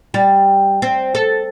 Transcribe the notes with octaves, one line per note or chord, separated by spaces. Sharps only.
G3
C4
A4